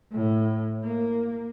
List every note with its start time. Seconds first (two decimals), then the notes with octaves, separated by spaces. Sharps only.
0.12 A2
0.84 A#3